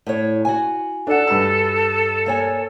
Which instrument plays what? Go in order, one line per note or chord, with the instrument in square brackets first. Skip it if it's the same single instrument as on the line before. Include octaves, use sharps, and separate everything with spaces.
[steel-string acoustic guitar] A2 C#5
F#4 G#5
[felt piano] D4 F#5 [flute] A4
[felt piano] G2 B4 E6
[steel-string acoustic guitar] A#3 C#5 G#5